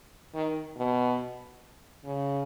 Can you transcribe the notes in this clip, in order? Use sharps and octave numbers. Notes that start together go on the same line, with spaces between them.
D#3
B2
C#3